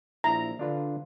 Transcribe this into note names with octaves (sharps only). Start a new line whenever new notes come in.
A#1 E4 A#5
D3 D4 F4 B4